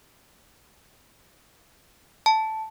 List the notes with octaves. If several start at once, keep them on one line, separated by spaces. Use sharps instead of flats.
A5